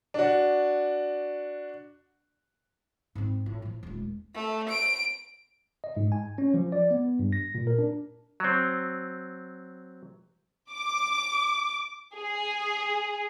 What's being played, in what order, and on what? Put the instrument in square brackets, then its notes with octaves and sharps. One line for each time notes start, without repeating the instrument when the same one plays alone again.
[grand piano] D4 F#4
[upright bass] G#2 C4
A2
A2 F3
D#1 G#3
[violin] A3
D7
[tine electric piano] D#5
G#2
G#5
C#4
F3
D5
B3
G2
A#6
A#2
A#4
D4
[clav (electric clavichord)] F#3 C4
[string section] D6
G#4